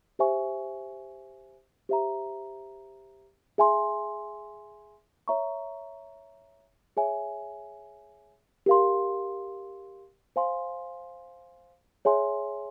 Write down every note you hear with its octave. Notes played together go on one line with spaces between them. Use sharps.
G4 C5 E5 G#5 C#6
G4 C5 E5 A#5
G#4 E5 G#5 C6
C#5 E5 A#5 C#6
G#4 C#5 E5 G#5
G4 A#4 F5 C6
C5 F5 G#5 C6
G#4 C#5 E5 G#5 C6